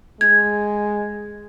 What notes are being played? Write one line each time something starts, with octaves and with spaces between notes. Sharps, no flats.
G#3 G#6